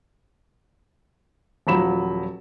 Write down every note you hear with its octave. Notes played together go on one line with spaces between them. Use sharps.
D#1 F3 F#3 B5 E7